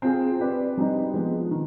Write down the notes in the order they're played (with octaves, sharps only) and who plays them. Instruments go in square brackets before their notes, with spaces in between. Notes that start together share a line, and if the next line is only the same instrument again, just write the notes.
[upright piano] C4 F4 G#4
C4 G4 B4 D5
G3 C4 D#4
F3 G#3 B3
D#3